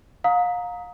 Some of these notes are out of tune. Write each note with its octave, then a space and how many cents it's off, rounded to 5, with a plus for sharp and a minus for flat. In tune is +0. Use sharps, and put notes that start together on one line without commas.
F5 +35 A#5 +0 D#6 +25